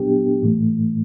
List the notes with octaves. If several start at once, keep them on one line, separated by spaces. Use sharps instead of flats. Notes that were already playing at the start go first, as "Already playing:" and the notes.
Already playing: A#2 F#3 B3 D4 G4
A2 E3 A3